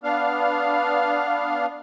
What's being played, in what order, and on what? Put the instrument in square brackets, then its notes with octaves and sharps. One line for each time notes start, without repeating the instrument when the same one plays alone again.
[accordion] B3 D4 F5